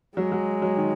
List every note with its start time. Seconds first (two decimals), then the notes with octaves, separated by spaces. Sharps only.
0.17 F#3 G#3
0.32 F#3
0.62 F#3
0.77 D#3